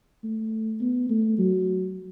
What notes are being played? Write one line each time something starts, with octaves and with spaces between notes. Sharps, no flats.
A3
B3
A3
F#3